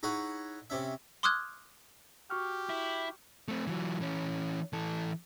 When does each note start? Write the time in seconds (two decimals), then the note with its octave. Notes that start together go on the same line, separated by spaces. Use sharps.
0.03 D#4 E4 G#4 C#5 F#5
0.70 C3 C#4 E5
1.23 C6 D6 D#6 F6 F#6 G#6
2.30 F#4 G4 C#6 F6
2.70 E4
3.48 A3 C4
3.67 E3 F#3
4.01 E3 C#4
4.73 E3 A4